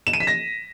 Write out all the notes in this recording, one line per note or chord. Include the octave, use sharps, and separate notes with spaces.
E7
D#7
B6
A#6